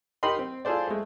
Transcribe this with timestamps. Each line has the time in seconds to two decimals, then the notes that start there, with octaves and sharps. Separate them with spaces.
0.23 D#4 G4 A#4 D#5 B5 C6
0.39 C4
0.65 F4 G#4 A4 C5 D5
0.87 G#3 A3